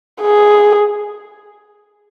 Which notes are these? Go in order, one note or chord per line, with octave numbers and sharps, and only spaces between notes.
G#4